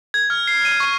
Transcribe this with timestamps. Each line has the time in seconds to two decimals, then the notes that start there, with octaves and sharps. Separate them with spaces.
0.14 G#6
0.30 F6
0.47 C7
0.65 D#7
0.80 C#6